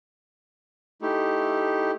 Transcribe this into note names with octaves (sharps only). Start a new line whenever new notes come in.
A3 D#4 E4 G4